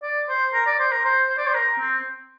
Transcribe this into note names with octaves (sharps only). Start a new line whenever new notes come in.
D5
C5
A#4
D5
C5
A#4
C5
C5
D5
C5
A#4
C4